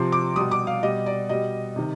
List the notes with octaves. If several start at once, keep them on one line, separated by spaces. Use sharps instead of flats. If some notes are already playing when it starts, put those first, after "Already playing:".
Already playing: C3 F3 C6
D6
B2 G3 D#6
D6
F5
B2 G3 D#5
D5
B2 G3 D#5
C3 D#3